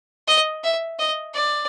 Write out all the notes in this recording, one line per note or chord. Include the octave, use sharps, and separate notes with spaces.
D#5
E5
D#5
D5